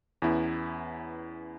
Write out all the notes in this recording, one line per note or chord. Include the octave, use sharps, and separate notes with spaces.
E2 B3 C#4 E4